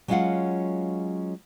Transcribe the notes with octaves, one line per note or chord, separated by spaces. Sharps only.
F#3 G#3 C#4 F4 F5 F#5